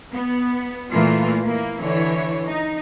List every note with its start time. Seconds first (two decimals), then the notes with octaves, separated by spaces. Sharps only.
0.13 B3
0.92 A#2 E3 A3 A#3 F4
1.45 A#3 E4
1.81 D3 E3 C#5
2.48 D#4